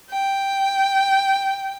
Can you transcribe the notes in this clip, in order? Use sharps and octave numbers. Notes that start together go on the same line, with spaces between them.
G5